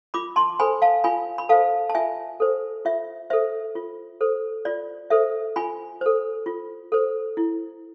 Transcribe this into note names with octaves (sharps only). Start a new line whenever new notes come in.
F4 B5 D6
A5 C6
A4 C5 G#5 B5
F5 A5
F4 G#5 B5
B5
A4 C5 F5 A5
A5
F4 E5 G#5
A4 C5
F4 E5
A4 C5 E5
F4
A4 C5
F4 D5
A4 C5 E5
F4 G#5 B5
A4 C5
F4
A4 C5
E4